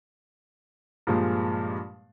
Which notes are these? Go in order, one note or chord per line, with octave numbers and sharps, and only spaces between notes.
G2 A#2 F3 G#3